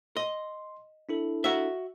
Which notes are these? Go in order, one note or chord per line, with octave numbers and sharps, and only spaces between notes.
D#5 C6
D4 E4 A4
F#4 E5